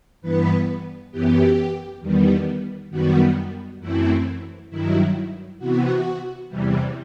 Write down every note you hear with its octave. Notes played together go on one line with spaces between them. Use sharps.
G2 E3 B3 B4
F#2 E3 B3 G4
E2 D#3 G3 B3
F#2 D#3 G3 B3 F#4
F#2 E3 A3 C4 E4
G2 D#3 F#3 E4
C3 E3 B3 F#4
E2 C3 E3 G3